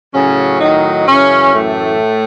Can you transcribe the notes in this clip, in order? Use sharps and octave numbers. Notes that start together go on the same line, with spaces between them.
A2 C#3 F#3 C#4
D#3 D#4
F#2 C#3 E3 C#4
A2 A3